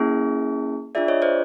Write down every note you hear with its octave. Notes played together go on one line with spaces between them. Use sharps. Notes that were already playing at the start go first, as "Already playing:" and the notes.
Already playing: A#3 C#4 E4 G#4
D4 F4 G#4 D5 E5
C#5 D#5
C5 D5